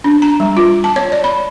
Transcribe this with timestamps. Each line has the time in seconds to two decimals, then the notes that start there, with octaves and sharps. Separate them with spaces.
0.04 D4
0.22 A#5
0.40 G3
0.57 F4
0.84 A5
0.96 C#5
1.12 D5
1.24 B5